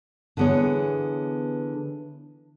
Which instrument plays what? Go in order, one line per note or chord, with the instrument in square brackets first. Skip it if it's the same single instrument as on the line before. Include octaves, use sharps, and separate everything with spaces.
[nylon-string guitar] D3 E3 B3 G#4 C#5